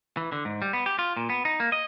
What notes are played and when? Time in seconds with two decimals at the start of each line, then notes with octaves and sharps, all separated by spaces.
0.17 E3
0.32 D3
0.45 G#2
0.62 G3
0.73 B3
0.86 G4
0.99 F4
1.17 A#2
1.30 B3
1.45 D#4
1.60 A#3
1.72 D#5